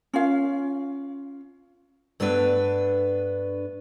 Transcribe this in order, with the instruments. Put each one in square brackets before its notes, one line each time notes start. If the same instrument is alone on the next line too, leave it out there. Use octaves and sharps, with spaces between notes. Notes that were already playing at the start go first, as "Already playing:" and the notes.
[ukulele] C#4 F4 F5
[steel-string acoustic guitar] G2 A3 B3 D4 B4